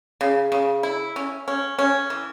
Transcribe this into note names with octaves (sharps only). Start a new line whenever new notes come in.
C#3
C#3
E4
C#4
C#4
C#4
E3